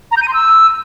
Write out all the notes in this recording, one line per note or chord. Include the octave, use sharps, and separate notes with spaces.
A#5
G6
D#7
C6
E6